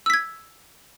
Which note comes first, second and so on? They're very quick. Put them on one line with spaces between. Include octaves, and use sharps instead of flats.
E6 B6 G#6